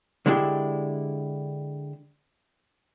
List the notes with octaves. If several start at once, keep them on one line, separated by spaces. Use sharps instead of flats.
D3 G#3 D4 E4 G4